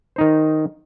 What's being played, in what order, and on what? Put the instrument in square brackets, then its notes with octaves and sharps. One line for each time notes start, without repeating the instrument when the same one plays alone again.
[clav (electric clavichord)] D#3 D#4 C5